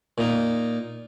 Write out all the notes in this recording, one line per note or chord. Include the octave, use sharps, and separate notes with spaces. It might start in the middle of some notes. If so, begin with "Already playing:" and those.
A#2 D#4